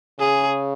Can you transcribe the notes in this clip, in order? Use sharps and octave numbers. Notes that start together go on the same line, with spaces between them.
C#3 G#4